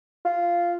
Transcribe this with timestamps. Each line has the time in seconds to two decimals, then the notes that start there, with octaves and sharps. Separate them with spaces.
0.25 F4